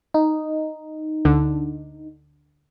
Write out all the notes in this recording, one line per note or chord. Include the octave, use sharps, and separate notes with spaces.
D#4
D2 D3 D4